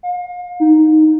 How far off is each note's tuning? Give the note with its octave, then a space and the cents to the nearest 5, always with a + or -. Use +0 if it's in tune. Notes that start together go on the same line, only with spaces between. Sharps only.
F5 +35
D#4 +0